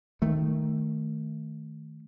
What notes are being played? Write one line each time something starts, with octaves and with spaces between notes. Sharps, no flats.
D#3 A3